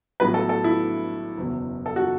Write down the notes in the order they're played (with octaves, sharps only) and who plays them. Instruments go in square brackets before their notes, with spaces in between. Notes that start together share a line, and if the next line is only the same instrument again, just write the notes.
[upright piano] A1 A2 F#3 B3 B4
A4
A4
E4
F#1 E2 B2
A4
F#4